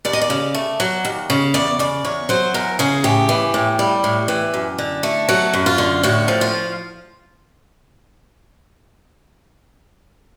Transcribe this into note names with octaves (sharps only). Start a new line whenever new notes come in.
D#2 D5
D#5
D5
C#3
A3
F#3
D#2
C#3
E2 D5
C#3 D5
E2 C#5
F#3 C5
E2 A#4
C#3 G#4
A2 G4
E3
A2
G3
A2
E3
F#2
D3
A3
F#3 F#4
F#2
F4
D3
A2 F#4
F3
F4